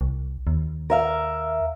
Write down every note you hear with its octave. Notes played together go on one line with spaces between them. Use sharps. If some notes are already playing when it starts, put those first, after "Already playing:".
C2
D#2
A#4 E5 F5